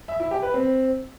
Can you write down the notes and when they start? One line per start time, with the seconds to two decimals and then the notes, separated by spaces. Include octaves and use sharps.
0.08 E5
0.20 E4
0.31 G4
0.43 B4
0.54 C4